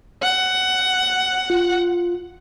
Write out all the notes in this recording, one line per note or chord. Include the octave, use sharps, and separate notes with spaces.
F#5
F4